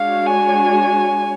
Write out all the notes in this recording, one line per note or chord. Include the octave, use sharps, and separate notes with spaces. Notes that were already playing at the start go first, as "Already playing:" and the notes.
Already playing: G#3 D4 F#4 C#5 F5
G#5